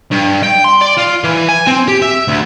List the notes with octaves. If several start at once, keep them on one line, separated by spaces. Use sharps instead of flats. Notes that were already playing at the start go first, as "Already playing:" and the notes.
G2
G5
C6
D5
F4
E3
G#5
C4
G4
E5
D2